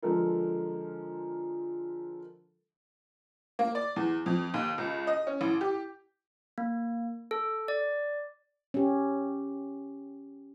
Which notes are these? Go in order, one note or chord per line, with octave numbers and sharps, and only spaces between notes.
D3 F3 G#3 A4 A#4
A#3
D5
E2
F2
D#2
C#2
D#5
C#4
A1
G4
A#3
A4
D5
C#4 G4